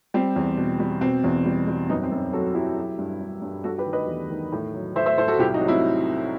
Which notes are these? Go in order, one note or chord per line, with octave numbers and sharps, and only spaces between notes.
G3 C4
E2
B2
G3
B2 C4
E2
G3
G3
F#2 B3 D#4
C4
F#2
F#3 F#4 A4
F#3 E4 G4
F#3
G2
G2
G2
G3 F#4 A4
G4 B4
D#3
B4 D#5
E2
D#3
A2
F#3
A2 C5 E5
C5 E5
A2 A4 C5
F#4 A4
C2 E4 G4
D#4 F#4
F#3
C4 E4